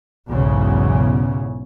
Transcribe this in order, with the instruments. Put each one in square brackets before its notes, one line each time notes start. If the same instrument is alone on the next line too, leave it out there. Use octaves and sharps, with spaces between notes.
[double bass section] B1 E2 G#2 C#3